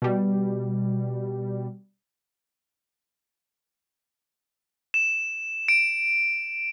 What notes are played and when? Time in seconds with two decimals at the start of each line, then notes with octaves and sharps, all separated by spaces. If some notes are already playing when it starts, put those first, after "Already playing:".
0.02 B2 G3
4.94 E7
5.68 D7